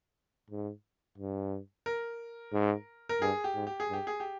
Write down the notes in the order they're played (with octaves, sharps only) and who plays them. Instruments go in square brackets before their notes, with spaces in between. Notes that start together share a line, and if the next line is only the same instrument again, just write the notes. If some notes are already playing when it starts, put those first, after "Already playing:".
[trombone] G#2
G2
[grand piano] A#4
[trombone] G#2
[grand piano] A#4
[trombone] G2 [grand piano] G#4
[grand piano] G4
[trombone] G#2
[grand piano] G4
G#4
[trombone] G2
[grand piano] G4
G#4
G4